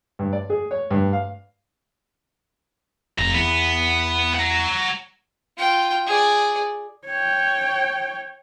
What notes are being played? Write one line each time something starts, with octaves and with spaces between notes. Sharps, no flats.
G2
D5
G#4
C#5
G2
F5
F1 A#2 A#5
E2 B3
F#5 A#5
F4 G5
G#4 D5
C#5 G5